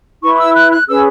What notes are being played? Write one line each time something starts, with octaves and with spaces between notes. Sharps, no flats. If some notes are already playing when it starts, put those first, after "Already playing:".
E4 B4 C#6
C#6
E6
F#6
F#6
C#4 G#4 B4 E6